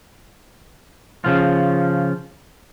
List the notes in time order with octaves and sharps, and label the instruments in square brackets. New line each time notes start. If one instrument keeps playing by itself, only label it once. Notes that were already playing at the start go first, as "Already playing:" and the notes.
[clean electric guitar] C#3 F3 F4